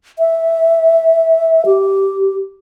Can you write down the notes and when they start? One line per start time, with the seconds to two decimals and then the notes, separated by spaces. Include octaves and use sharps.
0.19 E5
1.66 G4